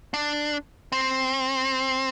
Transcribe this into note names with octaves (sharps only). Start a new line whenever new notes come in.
D4
C4